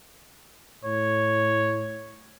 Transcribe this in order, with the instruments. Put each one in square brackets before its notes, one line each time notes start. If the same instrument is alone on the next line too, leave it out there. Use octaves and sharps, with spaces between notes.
[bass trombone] A2 [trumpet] C#5